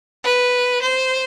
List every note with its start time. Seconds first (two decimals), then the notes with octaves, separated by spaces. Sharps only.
0.24 B4
0.81 C5